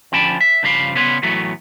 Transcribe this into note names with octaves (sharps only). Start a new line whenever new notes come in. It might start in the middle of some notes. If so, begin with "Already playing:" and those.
D3 F3 C#4 G5 A5 B5
E5
G2 C#3 F3 G4 F5 B5
C#3 G3 B3 B4 C#5 C6
A2 E3 F#3 A3 B3